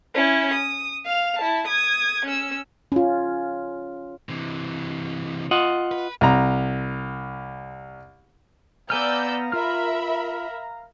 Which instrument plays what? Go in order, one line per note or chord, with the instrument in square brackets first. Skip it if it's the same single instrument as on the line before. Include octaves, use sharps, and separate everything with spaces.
[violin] C#4 E4
D#6
F5 F7
E4 A5
D#6 G#6
C#4 E6
[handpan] C#4 F4
[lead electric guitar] C3 E3
[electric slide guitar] F4 D#5 F#5
[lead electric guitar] B4
[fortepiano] C2 A#5
[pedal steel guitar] B3 G#5 F6 [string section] D5 E6 G6 [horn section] F5 A#5
[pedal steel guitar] F4 F6 [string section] A#4 E5 B5